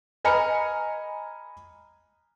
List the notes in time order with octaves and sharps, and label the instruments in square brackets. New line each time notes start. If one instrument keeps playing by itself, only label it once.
[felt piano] D#5 G#5 A#5 B5 F6 C#7